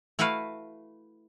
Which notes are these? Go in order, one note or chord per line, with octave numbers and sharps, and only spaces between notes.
A3 E4 F#4 B4 F5